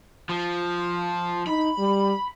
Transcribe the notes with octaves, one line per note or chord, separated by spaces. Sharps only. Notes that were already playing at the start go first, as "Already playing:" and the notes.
F3
D#4 B5
G3